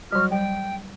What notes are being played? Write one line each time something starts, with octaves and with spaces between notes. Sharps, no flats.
F#3 G3 F#4 F6
G3 G5